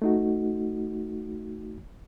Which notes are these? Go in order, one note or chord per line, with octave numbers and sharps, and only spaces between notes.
A3 D#4 F#4